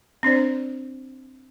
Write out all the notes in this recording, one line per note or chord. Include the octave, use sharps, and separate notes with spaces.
C4 D4 C5 D5